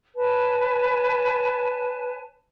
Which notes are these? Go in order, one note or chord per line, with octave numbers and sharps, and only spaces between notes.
B4 C#5 G#5 A5